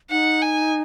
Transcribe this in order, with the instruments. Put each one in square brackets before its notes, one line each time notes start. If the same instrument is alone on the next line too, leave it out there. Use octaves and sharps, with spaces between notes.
[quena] D#4 [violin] F#5
[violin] G#5